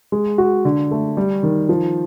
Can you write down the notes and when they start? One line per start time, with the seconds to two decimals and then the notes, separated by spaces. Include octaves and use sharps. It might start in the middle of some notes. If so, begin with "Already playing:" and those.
0.12 G#3
0.38 F#4
0.65 D3
0.91 A3
1.17 G3
1.43 D#3
1.69 F3